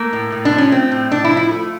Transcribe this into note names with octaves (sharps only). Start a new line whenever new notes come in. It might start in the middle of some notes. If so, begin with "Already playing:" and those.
Already playing: A3 A#3
A2
A2
D4
F3
C#4
A3 C4
A2
A2 D4
E4
F3
E4
A3